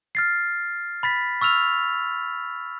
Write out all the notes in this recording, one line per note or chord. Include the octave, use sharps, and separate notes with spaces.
F6 A6 C7
B5 A6 B6
C#6 E6 F6 F7